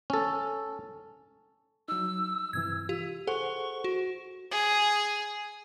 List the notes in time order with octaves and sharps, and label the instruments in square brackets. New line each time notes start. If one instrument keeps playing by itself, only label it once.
[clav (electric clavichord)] C#4 A4
[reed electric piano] F#3 D#4 [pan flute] E6
[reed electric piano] G2 C3 E3 [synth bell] G#6
[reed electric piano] F4 [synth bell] G4
[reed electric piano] G#4 C5 F#5 [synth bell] A4 [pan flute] C#6
[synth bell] F#4
[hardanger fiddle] G#4